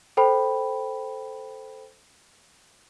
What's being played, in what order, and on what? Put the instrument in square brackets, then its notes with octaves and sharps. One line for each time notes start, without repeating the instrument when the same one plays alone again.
[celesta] A4 C5 G5 B5